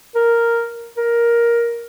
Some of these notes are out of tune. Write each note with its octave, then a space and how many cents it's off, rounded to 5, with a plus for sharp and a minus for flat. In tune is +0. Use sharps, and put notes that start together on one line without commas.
A#4 +0
A#4 +10